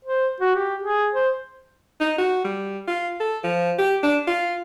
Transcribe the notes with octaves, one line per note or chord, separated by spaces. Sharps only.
C5
F#4
G4
G#4
C5
D#4
F#4
G3
F4
A4
F3
G4
D4
F4